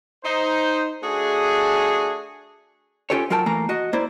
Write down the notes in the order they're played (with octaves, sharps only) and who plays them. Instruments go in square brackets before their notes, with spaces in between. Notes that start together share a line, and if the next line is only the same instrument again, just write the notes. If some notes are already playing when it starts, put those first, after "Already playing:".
[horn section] D#4 C5
A3 D4 F#4 G#4
[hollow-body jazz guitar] C#4 F4 G4 A4 C#5
F#3 F4 A#4 G5 A5
E3 A3 A#3 A#5
F#4 D#5
A#3 E4 C5 D5